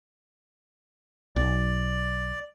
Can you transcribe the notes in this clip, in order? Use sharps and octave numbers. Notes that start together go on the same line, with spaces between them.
B1 D5